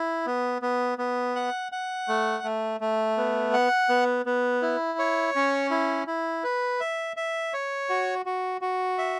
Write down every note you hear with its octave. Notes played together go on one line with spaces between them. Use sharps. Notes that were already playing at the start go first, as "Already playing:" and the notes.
Already playing: E4
B3
B3
B3
F#5
F#5
A3
A3
A3
B3
F#5
B3
B3
E4
C#5
C#4
E4
E4
B4
E5
E5
C#5
F#4
F#4
F#4
E5